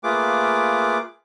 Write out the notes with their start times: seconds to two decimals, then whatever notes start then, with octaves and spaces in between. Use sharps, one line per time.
0.04 A3 A#3 F4 G#4 B4 D6